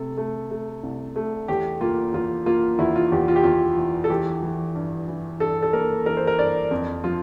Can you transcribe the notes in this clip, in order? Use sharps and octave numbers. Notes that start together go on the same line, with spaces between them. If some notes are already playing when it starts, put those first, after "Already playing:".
Already playing: C3 A3 A4
A3
A3
C2
A3
E2 G4
A#3 F4
E2 F4
A#3 F4
E2 E4
F4
E2 G4
F4
G4
E2 F4
E3
A4
E3 G4
E3
G2
E3
G2 A4
A4
A#3 A#4
E3 A#4
C5
A#4
G2 D5
F2
F3 F4